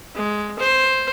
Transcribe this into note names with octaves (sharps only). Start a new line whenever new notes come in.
G#3
C5